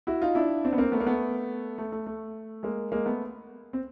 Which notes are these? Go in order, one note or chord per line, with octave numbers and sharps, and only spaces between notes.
E4 F#4
D#4 F4
D4 E4
C4 D4
B3
A#3 C4
A3 B3
A#3
A3 B3
A3
A3
A3
G#3 A#3
G#3 A#3
A3 B3
C4